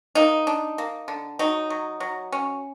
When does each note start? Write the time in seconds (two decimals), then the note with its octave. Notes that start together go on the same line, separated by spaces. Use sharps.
0.15 A#3 D#4
0.47 D4
0.78 A#3
1.08 D3
1.39 F#3 D#4
1.70 F#3
2.00 F#3
2.32 C#4